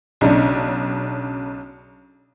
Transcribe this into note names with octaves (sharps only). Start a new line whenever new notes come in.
B1 C#3 D4